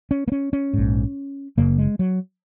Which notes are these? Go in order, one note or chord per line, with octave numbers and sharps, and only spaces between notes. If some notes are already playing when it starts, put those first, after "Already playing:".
C#4
A#3
C#4
C#4
A#1 G#2
F#1 F#2 C#3 A#3
G#3
F#3